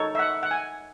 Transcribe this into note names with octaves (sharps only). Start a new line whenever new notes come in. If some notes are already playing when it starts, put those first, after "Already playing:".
Already playing: D#4 A4 C#5
E5
F#5
F#5
G#5